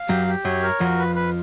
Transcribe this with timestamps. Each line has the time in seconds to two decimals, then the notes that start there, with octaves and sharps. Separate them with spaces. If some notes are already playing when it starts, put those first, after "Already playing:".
Already playing: F5
0.09 F#2 F#3 G4
0.27 G4
0.45 F#2 F#3 C#5
0.62 A#4
0.80 F2 F3 F#4
0.98 B4
1.15 B4